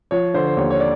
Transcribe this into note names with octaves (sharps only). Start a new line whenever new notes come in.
F3 C#5
D3 C5
C5
D#2 C#5
C#5
D5